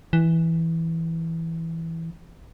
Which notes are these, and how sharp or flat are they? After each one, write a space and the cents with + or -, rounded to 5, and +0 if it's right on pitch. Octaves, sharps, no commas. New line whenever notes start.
E3 -5